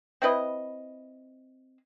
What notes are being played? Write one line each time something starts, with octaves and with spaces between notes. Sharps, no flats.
C4 E4 B4 D#5